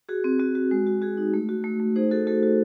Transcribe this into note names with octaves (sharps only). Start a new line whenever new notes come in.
F#4 G#4
C4
C4 F#4
F#4
G#3
F#4
F#4 G#4
D#4
A3
F#4
A3
A3
D#4 G#4 C5
F#4 A4
A3 F#4 A4
F#4